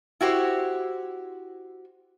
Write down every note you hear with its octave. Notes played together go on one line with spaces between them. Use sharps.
E4 F#4 G4 C5